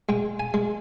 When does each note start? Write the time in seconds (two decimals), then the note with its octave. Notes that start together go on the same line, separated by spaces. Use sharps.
0.09 G#3 G5
0.40 G#5
0.54 G#3